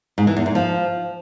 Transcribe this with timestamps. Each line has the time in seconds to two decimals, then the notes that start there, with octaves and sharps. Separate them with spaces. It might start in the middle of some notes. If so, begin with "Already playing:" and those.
0.18 G#2
0.27 E3
0.36 E2
0.46 G#2
0.55 F3